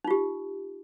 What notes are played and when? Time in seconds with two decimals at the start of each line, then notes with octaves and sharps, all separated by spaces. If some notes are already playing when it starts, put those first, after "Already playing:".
0.04 D#4
0.08 F4
0.11 G4